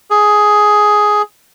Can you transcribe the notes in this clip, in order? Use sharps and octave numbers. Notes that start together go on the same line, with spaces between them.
G#4